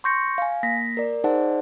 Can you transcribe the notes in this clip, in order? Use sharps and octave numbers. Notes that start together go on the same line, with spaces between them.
C6 C#6 G6 A#6 C#7
F5 G#5
A#3 A#6 B6
A#4 D5
D#4 G#4 C5 D5 F#5 A5